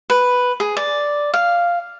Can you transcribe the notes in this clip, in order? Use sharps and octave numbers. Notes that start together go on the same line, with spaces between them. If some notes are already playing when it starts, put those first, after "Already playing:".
B4
G#4
D5
F5